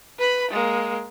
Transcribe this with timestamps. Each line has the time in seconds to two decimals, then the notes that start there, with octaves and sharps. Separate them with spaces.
0.18 B4 B5
0.51 G#3 A#3